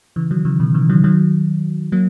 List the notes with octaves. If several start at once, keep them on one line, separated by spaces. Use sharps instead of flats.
C#3 E3
D#3 F#3
C#3 E3
B2 D#3
C#3 E3
D#3 F#3
D#3 F#3
F#3 A#3